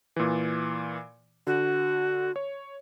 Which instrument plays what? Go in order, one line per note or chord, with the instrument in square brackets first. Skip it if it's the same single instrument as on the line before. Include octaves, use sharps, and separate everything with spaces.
[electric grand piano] A#2 E3
[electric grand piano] D3 [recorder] F#4
[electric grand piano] C#5